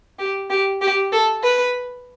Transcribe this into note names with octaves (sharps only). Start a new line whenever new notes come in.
G4
G4
G4
A4
B4